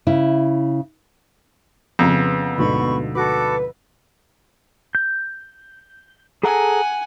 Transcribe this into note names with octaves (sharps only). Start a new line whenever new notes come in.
C#3 E4
F2 C#3 B3 A#5
D2 G#2 B2 B5 C#6
F#4 A4 B4 D6
G6
G#4 A4 F#5 G#5 A#5